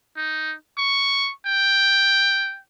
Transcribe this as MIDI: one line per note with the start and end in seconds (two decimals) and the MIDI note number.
0.17 0.55 63
0.78 1.32 85
1.46 2.60 79